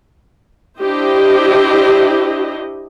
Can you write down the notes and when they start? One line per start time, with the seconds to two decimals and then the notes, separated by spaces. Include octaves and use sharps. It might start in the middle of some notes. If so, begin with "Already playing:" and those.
0.79 D4 E4 G4 C5 D#5